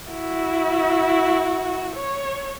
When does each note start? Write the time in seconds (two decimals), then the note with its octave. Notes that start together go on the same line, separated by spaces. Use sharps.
0.12 E4 F#4
1.96 C#5